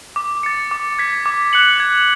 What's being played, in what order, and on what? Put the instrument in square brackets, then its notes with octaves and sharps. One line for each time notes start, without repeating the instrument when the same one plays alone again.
[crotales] D6
A6 C#7
D6
G#6 B6
D6
F#6 C#7 F#7
G#6